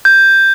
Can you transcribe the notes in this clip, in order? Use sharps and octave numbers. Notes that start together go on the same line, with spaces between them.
G6